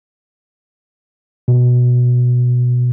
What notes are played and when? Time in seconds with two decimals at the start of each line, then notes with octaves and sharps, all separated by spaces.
1.48 B2